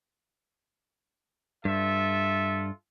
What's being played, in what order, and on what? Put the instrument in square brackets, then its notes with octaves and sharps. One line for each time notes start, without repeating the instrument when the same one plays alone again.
[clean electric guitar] G2 [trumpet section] F4 A4 E5